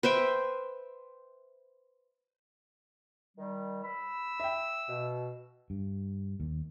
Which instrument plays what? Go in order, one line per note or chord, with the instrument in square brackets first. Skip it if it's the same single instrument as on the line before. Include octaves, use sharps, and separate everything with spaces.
[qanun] B4 C5 E5 G5
[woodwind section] D#3 G3
[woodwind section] B5 [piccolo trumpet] E6
[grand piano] E5 G5
[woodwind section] B2
[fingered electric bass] G2
D#2